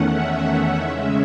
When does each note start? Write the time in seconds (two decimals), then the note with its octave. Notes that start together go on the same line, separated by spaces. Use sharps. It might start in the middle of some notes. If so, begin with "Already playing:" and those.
Already playing: E2 D#3 A3 C#4 F#5
0.09 E5
0.78 C#3 G#3 C#4